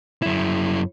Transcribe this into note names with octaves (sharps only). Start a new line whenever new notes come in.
F#2 E4